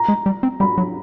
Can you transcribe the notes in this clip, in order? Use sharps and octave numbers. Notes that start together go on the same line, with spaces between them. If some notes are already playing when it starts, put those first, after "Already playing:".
Already playing: A#5
G#3
G3
C4
G3 B5
F#3